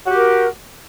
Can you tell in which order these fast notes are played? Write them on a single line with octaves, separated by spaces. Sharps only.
F#4 G4 A#4